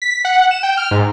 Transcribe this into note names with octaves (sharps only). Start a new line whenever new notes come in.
B6
F#5
E7
G5
F6
G#2